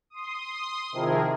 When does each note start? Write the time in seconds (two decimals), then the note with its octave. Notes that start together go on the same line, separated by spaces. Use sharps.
0.10 C6 D#6
0.92 C3 D#3 F3 E4 G#4 A#4